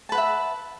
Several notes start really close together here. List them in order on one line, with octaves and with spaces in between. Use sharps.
A5 B4 F#5 E5